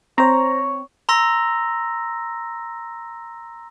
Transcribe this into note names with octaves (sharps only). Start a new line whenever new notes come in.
C4 C5 C#5 A#5
A#5 C6 E6 A#6